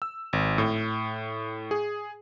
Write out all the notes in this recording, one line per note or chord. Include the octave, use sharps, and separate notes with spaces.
E6
G#1
A2
G#4